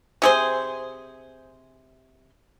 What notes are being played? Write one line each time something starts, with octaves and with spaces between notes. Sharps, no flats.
C3 G#4 C5